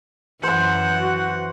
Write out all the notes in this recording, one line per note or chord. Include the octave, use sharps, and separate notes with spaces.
F#2 E3 C5 F#5 C6
F#4